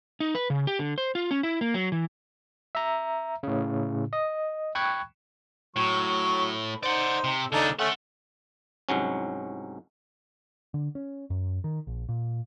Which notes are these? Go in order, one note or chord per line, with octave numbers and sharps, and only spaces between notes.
D#4
B4
C#3
G4
D3
C5
F4
C#4
E4
A#3
F#3
E3
E5 A#5
A2 C#3
D#5
G5 B5 C#6 F#6 G#6
A2 F#3 C#6
D#4 C5 D5 F#5
C3
D#2 C#3 D4 D#4 A4
A3 C#4 A4 F#5
C2 G#2 F#3 C#4
D3
C#4
F#2
D#3
A#1
A#2